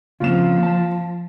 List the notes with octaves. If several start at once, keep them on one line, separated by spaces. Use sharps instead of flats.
C#3 F3 A#3 C4 F4 E7
A5